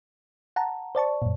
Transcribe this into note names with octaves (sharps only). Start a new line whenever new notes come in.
F#5 A5 A#5
C5 D5 A5 C#6
F#2 A#2